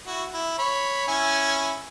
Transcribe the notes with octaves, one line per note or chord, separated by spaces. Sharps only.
E4 F#4
E4
C#5 B5
C#4 E4 G#5